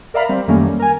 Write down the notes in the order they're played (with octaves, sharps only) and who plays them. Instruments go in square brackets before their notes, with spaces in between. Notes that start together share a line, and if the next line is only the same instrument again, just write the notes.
[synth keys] A#4 D5 E5 F5 A#5 B5
G3 C4
F#2 D#3 G3 A3 A#3 C#4
A#4 G#5